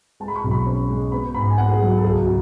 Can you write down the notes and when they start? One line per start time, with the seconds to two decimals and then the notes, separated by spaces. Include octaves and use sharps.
0.20 G#3 A5
0.28 B5
0.36 C#6
0.44 B1
0.51 B5
0.66 C#4
0.89 G#3
1.12 B3 B5
1.34 G#2 B5
1.50 G#5
1.58 B3 F#5
1.69 G#4
1.81 F#3 F#4
1.92 F#4
1.98 A4
2.04 C#2 G#4
2.19 F#4
2.27 C#3